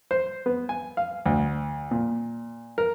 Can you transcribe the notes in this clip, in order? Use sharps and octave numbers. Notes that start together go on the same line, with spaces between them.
C5
B3
G#5
F5
D2
A#2
A#4